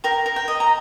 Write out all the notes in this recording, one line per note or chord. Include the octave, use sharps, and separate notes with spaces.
A#4 G5
A#4
G5
D#5
A#5